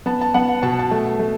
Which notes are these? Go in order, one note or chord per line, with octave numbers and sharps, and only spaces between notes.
B3 A5
A5
B3 F#5
B2 A5
A5
A3
A3